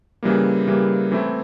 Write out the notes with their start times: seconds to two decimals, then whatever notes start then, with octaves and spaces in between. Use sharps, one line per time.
0.23 C#3 E3 G3 A#3
0.67 C#3 E3 G3 A#3
1.12 E3 A3 C4 E4